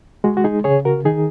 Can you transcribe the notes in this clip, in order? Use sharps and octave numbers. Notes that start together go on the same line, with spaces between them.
G#3 F#4
F#4
D#4 G#4
C#3 G#4 C#5
F#4 A#4
D#3 D#4 G#4